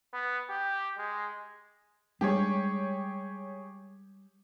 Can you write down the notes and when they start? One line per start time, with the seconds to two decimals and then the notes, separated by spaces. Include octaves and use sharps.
0.13 B3
0.49 G4
0.98 G#3
2.21 G3 G#3 D4 G4 G#4 C#5